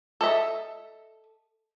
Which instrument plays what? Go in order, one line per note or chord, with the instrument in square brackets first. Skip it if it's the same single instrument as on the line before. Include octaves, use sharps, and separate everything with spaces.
[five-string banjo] A4 D#5 E5